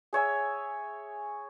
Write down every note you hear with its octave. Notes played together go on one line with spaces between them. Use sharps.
G#4 C#5 E5 G#5